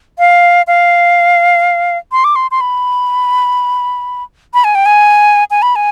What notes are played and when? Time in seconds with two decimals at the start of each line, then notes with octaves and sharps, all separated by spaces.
0.19 F5
0.67 F5
2.12 C6
2.24 D6
2.36 C6
2.51 C6
2.61 B5
4.54 B5
4.64 G#5
4.75 G5
4.86 G#5
5.51 G#5
5.62 B5
5.76 G#5